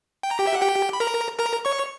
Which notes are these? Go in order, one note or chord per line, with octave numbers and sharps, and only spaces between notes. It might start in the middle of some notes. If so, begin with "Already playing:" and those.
G5
A#5
G4 G5
E5
F#5
G4 G5
B5
A#4 A#5
A#4 A#5
C#5 C#6